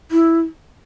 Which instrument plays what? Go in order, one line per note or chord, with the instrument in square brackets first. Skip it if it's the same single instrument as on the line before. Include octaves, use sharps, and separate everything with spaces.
[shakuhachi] E4